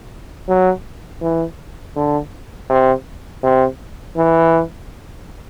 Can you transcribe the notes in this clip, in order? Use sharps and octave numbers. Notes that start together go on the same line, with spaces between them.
F#3
E3
D3
C3
C3
E3